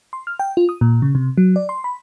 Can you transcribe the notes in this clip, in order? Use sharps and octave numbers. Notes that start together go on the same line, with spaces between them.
C6
F6
G5
F4
D#6
A#2
C#3
C3
F#3
D5
C6
B5